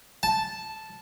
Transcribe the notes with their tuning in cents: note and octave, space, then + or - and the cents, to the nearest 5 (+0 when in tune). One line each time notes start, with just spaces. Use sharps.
A5 -5